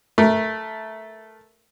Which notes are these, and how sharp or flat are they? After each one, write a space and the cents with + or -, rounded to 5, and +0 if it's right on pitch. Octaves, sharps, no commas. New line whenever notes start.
A3 +0 A#4 +10